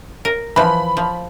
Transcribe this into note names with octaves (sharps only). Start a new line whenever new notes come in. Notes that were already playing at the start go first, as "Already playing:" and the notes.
A#4
E3 F3 B5
F3